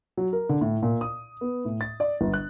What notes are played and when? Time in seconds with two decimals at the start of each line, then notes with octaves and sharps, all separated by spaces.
0.17 F#3
0.33 A#4
0.49 D3
0.61 A2
0.83 A#2
1.01 D#6
1.41 B3
1.65 A2
1.81 A6
2.00 D5
2.21 G1
2.34 F#6